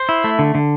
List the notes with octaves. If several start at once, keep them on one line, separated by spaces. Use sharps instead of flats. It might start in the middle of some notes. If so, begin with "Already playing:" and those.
Already playing: C5
E4
A3
D3
D3